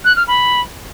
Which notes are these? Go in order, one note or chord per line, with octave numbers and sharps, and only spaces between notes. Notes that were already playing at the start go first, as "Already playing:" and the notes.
F#6
F6
B5